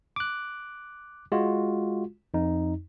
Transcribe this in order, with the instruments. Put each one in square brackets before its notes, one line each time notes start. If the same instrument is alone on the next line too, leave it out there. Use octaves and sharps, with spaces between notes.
[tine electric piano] D6 F#6
G#3 F4 F#4
F2 D#4